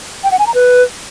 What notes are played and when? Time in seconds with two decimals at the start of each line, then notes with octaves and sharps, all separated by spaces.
0.24 G5
0.31 F#5
0.39 G#5
0.47 A#5
0.55 B4